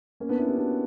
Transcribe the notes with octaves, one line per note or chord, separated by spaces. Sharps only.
A#3 C#4
B3 D4
C#4 E4
E4 G4
D4 F#4